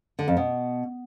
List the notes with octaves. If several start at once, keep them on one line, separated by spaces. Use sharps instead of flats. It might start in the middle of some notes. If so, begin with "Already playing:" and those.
D3
F2
B2